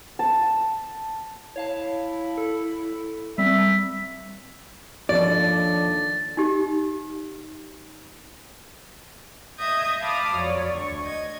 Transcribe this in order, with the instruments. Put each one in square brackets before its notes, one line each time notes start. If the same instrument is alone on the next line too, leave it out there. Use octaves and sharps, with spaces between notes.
[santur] A5
[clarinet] E4 [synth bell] C#5 F5 A5
[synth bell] A4
[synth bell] G3 C4 [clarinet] E5
[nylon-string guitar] D#2 F3 C#5 [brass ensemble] D4 A4 [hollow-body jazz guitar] D5 [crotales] A6
[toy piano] D#4 G4
[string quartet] D#5 E5 D#6 G6 G#6
F5 A5 B5 D6 D#6 F6
F2 F#3 C#5 D5
D2 C#6
D#5 G#6